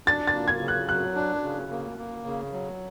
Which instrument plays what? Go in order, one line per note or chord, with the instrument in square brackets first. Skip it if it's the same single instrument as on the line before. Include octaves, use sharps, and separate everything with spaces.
[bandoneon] D4 [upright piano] A6
[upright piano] A6
[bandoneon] A#3
[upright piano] G#6
[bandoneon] C#3
[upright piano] F#6
[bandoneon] F#3 [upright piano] F#6
[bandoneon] D4
C#3
A#3
A#3
C#3
F#3